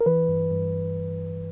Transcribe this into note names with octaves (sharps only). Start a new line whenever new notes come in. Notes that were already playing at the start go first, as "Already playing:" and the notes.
A#4
E3 B4
G2
G2